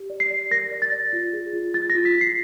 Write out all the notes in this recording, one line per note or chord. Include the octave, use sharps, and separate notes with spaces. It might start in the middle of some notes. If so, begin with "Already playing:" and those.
Already playing: G4
D5
C7
D5
A#4 A#6
D5
A6
D5
F4
G#4
F4
F4 A6
A#6
F4
B6
F4
C7